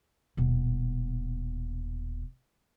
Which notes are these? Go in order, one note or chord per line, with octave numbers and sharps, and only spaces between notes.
D#1 B2